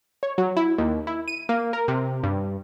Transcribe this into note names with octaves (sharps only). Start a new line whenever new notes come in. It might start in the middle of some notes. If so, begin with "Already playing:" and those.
C#5
F#3
E4
D#2
E4
D#7
A#3
A#4
C3
G2